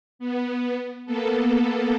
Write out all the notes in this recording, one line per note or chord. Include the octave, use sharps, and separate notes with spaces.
B3
A#3 B3 A4